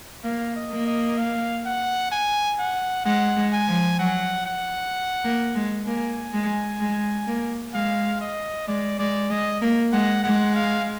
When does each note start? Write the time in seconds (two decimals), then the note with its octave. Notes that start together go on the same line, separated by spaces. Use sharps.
0.24 A#3 F5
0.56 D#5
0.71 A#3
0.87 D#5
1.18 F5
1.65 F#5
2.12 G#5
2.59 F#5
3.05 G#3 F#5
3.37 G#3
3.53 G#5
3.68 F3
3.99 F#3 F#5
4.46 F#5
5.25 A#3
5.55 G#3
5.87 A#3 G#5
6.33 G#3
6.81 G#3
7.27 A#3
7.74 G#3 F5
8.21 D#5
8.68 G#3 D5
8.99 G#3 D5
9.30 G#3 D#5
9.62 A#3
9.93 G#3 F#5
10.24 G#3 F#5
10.55 F5